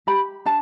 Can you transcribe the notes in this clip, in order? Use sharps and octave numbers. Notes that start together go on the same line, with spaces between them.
G4 B5
D4 A5